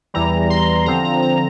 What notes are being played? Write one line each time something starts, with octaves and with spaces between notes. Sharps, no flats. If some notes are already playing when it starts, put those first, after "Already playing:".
E2 E3 G3 A#5
C6
D3 F3 C4 A#5
A#5
A#5